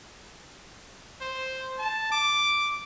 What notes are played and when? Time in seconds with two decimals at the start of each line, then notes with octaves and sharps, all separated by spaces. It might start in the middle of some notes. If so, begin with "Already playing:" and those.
1.21 C5
1.79 A5
2.12 D6